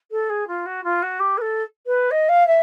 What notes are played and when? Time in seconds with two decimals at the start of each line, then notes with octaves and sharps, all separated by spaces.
0.11 A4
0.29 G#4
0.47 F4
0.66 F#4
0.84 F4
1.02 F#4
1.19 G4
1.37 B4
1.41 A4
1.86 B4
2.11 D#5
2.29 F5
2.47 E5